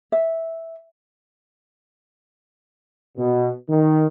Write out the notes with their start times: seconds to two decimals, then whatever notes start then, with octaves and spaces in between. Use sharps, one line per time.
0.12 E5
3.16 B2
3.68 D#3